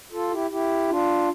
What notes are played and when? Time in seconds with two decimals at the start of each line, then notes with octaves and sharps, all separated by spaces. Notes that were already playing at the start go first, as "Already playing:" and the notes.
0.12 F4 A4
0.31 E4 G4
0.50 E4 G4
0.89 D4 F4